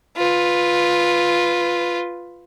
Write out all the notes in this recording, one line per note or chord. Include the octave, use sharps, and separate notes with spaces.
F4 B4